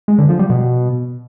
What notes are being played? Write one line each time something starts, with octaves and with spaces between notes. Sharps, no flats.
G#3
D3
F3
G3
B2